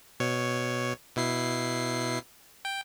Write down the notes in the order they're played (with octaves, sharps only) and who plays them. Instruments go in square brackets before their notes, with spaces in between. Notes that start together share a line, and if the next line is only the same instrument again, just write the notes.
[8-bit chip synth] B2 C#5
B2 E4 C7
G5